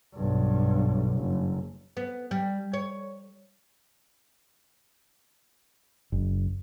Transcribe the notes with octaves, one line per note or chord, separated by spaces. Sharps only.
B1 G2
F#1
B3
G3
C#5
F#1